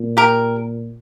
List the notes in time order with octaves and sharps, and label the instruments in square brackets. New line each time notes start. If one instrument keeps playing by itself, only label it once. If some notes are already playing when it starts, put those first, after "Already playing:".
Already playing: [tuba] A#2
[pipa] G4 A#4